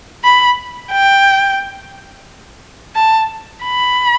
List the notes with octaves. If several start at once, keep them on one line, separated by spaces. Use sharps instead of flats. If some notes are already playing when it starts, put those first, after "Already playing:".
B5
G5
A5
B5